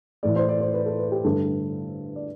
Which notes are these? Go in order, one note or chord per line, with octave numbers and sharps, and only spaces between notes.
A2 E3 A3 D5
C5
D5
C5
B4
A4
B4
G4
G2 D3 A3 A4
D5